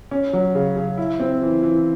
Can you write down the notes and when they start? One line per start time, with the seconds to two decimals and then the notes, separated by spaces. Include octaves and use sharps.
0.11 C#4
0.33 F#3
0.55 C#3
0.77 C#3
0.98 E4
1.20 C4
1.41 E3
1.63 E3